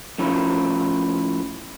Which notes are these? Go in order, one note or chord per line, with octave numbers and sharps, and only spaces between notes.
A2 F3 C#4 E4 F4 A#4